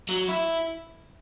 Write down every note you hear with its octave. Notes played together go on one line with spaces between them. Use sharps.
F#3
E4